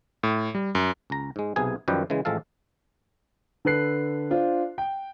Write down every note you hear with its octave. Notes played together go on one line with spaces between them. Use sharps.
A2
G3
F#2
C#2 A#5
G#2 G#3
B1 C3 B3 G#4 G#5
F#2 D#3 F3 G3 G4 B4
C#3 E3 G#3
A1 F3 G#3 A4 F5
D3 A4 B4 F#6 C7
D4 F4 C5
G5